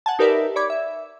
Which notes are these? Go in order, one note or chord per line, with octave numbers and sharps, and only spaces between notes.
F#5 G#5 A5
D#4 G4 A#4 B4 D5 E5
C#5 D5 B5 D6 G#6
E5